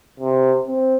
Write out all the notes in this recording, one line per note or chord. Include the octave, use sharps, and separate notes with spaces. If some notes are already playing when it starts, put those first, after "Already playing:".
C3
C4